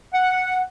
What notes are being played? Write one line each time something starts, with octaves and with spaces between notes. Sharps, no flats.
F#5